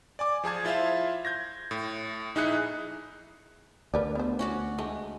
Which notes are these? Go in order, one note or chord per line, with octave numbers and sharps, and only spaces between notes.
D5 G#5 D6
F3 G#4 A5 G#6
E4 F4 C5 E5 F5
G6 G#6 A#6
A2
A#1 D#4 E4 G#4 F#6 C#7
D2 A#4 B4 D5
B3 C5
C#4 F#4 D5
G#3 A3 D4